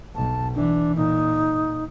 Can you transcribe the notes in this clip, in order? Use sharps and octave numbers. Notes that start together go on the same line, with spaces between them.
B1 A5
E3 D4
A#2 D#4